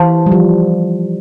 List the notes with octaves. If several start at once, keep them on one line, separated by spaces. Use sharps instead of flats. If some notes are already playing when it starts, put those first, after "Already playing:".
Already playing: E3 G4 C5 F5 A5 C6
G3
F3